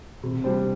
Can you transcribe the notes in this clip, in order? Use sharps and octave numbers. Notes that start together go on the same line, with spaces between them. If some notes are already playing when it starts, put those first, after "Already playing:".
C3
G3 D4 G4 C5